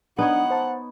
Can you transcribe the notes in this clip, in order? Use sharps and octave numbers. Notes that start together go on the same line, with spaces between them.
B3 D4 D#4 C#5 F#5
C5 A5